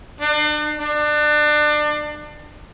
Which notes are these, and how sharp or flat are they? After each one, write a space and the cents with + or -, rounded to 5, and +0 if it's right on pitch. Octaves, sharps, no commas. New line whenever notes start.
D4 +40
D4 +30